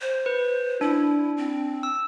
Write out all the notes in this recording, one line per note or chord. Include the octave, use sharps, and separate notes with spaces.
C5
B4
D4 E4
C4
E6